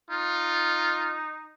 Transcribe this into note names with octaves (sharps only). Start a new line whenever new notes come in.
D#4 F4